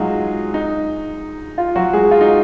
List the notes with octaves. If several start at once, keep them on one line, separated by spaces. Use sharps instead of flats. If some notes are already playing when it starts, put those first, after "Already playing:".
Already playing: F#3 G#3 D#4 F4 F#4 G#4
D#4
F4
F#3 F#4
G#3 G#4
F4
D#4